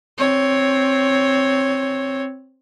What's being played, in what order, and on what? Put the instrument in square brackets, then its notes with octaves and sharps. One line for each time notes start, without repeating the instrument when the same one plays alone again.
[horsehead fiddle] C4 C#5